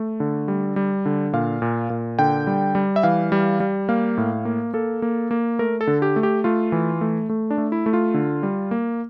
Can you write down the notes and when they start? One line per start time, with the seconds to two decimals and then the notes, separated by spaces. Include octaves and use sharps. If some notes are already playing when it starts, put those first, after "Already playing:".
Already playing: A3
0.20 D3
0.48 G3
0.76 G3
1.06 D3
1.33 A#2 F5
1.62 A#2
1.90 A#2
2.19 D3 G5
2.47 G3
2.75 G3
2.96 E5
3.03 E3 F5
3.32 G3
3.60 G3
3.89 A#3 F5
4.17 A2
4.45 A#3
4.74 A#3 A4
5.02 A#3
5.31 A#3
5.59 A3 A#4
5.81 A4
5.87 D3
6.02 G4
6.16 A3
6.23 G4
6.44 A3 F4
6.72 E3
7.01 A3
7.29 A3
7.50 D4
7.58 A3
7.72 E4
7.86 A3
7.93 F4
8.14 D3
8.43 G3
8.71 A#3